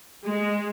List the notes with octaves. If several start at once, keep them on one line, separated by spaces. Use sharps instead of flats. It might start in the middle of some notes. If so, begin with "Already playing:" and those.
G#3